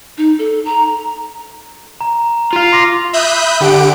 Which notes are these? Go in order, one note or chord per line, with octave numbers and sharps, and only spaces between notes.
D#4
A4
A#5
A#5
F4 F5
C6 D6 A#6
E5 B5 D#6 F#6 G6
D3 G4 F#5 D7